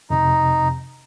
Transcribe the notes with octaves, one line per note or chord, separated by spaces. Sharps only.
F2 C3 D#4